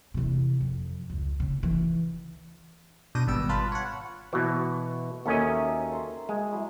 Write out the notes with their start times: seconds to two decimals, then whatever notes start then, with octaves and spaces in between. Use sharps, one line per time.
0.14 E2 C3
0.60 F2
1.10 C#2
1.40 C#3
1.63 E3
3.15 B2 D4 G6 A#6 D#7
3.27 G#1 G3 B3 E6 D7
3.49 F4 B4 A5 B5
3.72 C#5 F#5
4.33 B2 E3 F#4
5.26 D#2 C#4 A4 A#4 D#5 E5
5.92 C5 A#5
6.29 G#3
6.51 F#3 E4